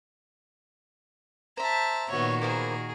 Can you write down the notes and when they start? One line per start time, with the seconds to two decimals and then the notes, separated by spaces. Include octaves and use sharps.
1.57 C5 E5 A5 A#5
2.09 A#2 D#3 B3 F#4 C#5
2.41 A#3 B3 G#4 A#4 C5